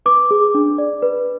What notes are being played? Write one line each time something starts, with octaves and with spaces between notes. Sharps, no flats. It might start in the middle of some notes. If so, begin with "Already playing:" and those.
B4 D6
G#4
D4
D5
B4